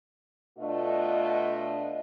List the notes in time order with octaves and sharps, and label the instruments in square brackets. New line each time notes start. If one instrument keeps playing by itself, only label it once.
[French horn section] B2 A3 D4 F4 D#5